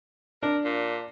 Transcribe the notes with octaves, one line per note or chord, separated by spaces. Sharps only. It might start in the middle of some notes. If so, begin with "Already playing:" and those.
D4 A#4
A#2